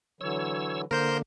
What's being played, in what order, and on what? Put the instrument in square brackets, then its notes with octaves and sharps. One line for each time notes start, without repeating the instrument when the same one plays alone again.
[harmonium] D3 E3 F#3 [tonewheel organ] C#5 E6
[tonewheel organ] D3 A#3 [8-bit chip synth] A#4 C5 G6